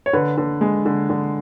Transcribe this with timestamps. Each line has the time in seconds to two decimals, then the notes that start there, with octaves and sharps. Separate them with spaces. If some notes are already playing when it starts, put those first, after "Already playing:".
0.06 C#5
0.13 D3 B4
0.38 D3
0.61 G#3
0.86 D3
1.10 D3